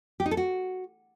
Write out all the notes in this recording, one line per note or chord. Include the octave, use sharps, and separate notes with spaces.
G4
D#4
A4
F#4